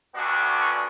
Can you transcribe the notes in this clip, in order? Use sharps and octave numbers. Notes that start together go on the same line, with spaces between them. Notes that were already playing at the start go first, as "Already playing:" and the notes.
D2 G2 B3 C#4 D4 F#4